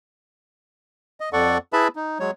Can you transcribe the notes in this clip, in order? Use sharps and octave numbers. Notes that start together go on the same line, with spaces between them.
D#5
F2 A4 D5 F#5 C#6
E4 G#4 B4 E5 A5 B5
D#4
F#3 G#3 C#5